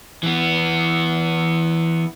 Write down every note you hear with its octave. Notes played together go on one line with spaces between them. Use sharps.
E3 B3